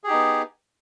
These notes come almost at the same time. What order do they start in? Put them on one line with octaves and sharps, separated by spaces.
G#4 G4 D#4 B3